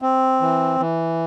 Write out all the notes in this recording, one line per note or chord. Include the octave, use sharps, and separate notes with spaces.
C4
E3
E3